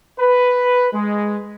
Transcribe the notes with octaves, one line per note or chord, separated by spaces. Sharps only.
B4
G#3